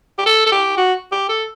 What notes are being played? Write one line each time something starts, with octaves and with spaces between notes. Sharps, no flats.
G4
A4
A4
G4
F#4
G4
A4